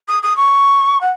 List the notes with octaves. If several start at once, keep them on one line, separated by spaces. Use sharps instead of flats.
D#6
D#6
C#6
F#5